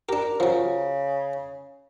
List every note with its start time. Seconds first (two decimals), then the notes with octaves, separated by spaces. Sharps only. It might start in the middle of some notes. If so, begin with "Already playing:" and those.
0.09 D4 G4 A#4
0.40 C#3 F3 F#3